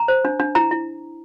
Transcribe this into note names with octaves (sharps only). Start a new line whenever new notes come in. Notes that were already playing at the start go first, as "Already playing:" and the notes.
Already playing: A#5
C5
D4
D4
E4 A#5
E4